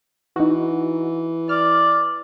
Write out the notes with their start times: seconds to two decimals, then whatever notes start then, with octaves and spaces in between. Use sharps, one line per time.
0.36 E3 D#4 F#4
1.49 D5 F6